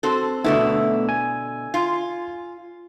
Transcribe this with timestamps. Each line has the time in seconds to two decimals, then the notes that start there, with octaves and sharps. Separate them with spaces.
0.03 C4 F#4 A4
0.44 B2 D3 A3 B3 E4
1.09 G#5
1.74 F4